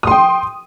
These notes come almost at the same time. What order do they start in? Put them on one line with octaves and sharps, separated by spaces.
D#6 C6 G5